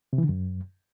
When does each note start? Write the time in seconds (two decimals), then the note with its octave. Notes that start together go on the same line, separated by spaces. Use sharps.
0.13 C3
0.18 E3
0.24 D3
0.29 F#2